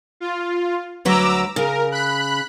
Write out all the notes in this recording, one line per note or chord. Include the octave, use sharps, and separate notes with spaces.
F4
D2 F#3 B4 A#5 D6 E6
C#3 A#4
B5 F#6